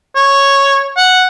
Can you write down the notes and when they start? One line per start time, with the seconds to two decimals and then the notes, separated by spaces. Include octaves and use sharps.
0.16 C#5
0.97 F#5